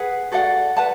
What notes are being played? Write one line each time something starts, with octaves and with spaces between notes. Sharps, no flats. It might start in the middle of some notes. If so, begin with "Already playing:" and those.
Already playing: G#4 B4 F#5
F#4 A4 D5 F#5
B4 F#5 A5